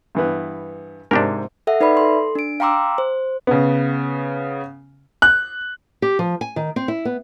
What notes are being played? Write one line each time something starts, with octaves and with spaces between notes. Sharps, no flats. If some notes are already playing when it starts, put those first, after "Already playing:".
G2 E3 B3
G#2 C3 D4 G4 A#4
A4 E5 F#5
D#4 B4 D5 E5 B5
A4 C6
D4 D7
F5 G5 A#5 C6 D6 E6
C5
C#3 B3
F#6
G4
F3
G#5
D#3
C4
E4
B3